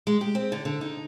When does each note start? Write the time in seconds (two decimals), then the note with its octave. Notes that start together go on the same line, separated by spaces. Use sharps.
0.07 G#3
0.21 G4
0.35 C4
0.52 D3
0.65 D3
0.81 D#4